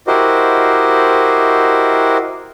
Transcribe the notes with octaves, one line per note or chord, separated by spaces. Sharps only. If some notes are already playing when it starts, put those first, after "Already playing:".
E4 F#4 G4 A#4 C5 D#5